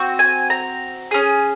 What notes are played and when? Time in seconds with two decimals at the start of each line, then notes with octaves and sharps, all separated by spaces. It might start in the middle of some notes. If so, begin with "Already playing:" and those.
Already playing: C4 F#4
0.19 G#5
0.50 A#5
1.11 C#4 G#4